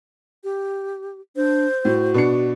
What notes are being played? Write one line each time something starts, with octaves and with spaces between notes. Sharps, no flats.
G4
D4 C5
A2 F#4
B2 D4 C#7